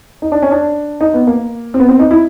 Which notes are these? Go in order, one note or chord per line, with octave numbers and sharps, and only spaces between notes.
D#4
D4
C#4
D4
D#4
B3
A#3
C4
B3
C4
D#4
E4